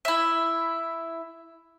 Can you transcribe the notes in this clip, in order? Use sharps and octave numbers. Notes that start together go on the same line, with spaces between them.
E4 E5